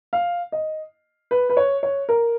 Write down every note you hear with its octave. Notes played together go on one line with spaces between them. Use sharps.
F5
D#5
B4
B4
C#5
C#5
A#4